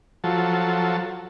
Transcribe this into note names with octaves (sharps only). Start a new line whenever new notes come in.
F3 F#3 A4